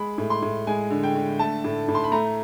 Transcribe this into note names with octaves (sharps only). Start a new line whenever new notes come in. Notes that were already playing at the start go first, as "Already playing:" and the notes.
Already playing: G#3 B5
A2
C6
A2
G#3 G#5
D3
G5
D3
A3 A5
A2
A2
C6
B5
A3 A#5